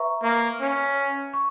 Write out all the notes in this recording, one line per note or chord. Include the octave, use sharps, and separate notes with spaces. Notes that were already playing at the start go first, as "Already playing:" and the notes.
Already playing: B4 E5 A#5 C#6
A#3
C#4
C#6